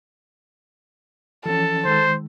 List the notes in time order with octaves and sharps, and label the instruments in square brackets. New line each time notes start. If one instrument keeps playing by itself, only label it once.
[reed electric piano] E3 F3 C#4 [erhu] A4
[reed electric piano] D#3 G#3 [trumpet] C5